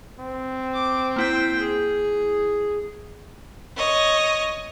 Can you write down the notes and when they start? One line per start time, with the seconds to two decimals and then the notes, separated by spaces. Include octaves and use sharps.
0.19 C4
0.74 D6
1.16 A#3 E4 C5 G5 G6
1.59 G#4
3.77 C#5 D#5